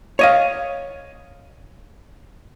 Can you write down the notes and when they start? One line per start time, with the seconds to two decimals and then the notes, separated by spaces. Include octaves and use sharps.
0.19 C#5 D#5 F5